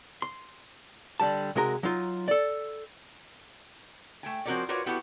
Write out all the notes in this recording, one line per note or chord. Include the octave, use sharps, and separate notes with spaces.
C6
D3 G3 A5
C3 G#3 F#4 A#4 A#5
F#3 D#4 F4
A4 D5
A3 G5 G#5
F3 C4 F#4 A#4 C#5 D5
F4 F#4 A#4 B4 C#5 D5
B3 E4 F#4 G4 A4